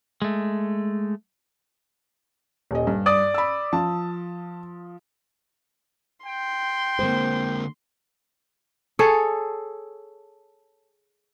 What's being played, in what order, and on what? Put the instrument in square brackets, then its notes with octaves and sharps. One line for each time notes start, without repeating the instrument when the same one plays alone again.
[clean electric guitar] G#3 A3
[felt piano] D#1 D#5
G2
[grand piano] D5 D#6
[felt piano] B5 E6
[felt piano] F3 [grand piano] A5
[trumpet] G5 [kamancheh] C6
[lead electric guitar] D3 G#3 [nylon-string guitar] A#3 C4 C5
[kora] G#4 A4 C#5